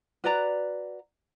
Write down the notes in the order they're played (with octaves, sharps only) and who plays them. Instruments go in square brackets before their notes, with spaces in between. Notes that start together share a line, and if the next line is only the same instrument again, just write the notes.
[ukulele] F#4 B4 D5 A#5